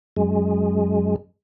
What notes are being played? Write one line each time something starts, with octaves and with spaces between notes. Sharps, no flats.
F#2 G#3